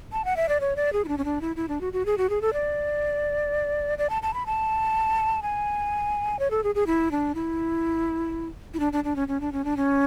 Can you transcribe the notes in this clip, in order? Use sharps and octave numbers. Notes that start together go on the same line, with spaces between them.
A5
F#5
E5
D5
C#5
D5
G#4
E4
D4
C#4
D4
E4
E4
D4
F#4
F#4
G#4
F#4
G#4
A4
D5
D5
A5
A5
B5
A5
G#5
C#5
A4
G#4
G#4
E4
D4
E4
E4
D4
D4
D4
C#4
C#4
D4
C#4
D4
C#4